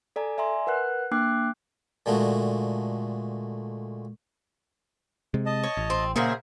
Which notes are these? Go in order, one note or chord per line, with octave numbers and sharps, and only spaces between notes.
A4 D5 G#5 A#5
D5 E5 G#5 A#5 C6
A#4 B4 F#5 F#6
A#3 D4 G5 D6 F#6 C7
A#2 D3 G#3 A3 F#4
C3 G#3
D#5 A5
C#5
A1
C4
A#2 C#3 A#3 G#4 A#4 C5 E5